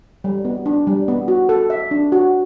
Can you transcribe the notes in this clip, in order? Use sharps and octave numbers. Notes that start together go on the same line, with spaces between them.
G3
B3
D4
G3
B3
F#4
A4
E5
D4
F#4